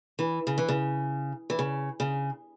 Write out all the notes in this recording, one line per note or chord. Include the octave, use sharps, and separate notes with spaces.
E3
C#3
E3
C#3
E3
C#3
C#3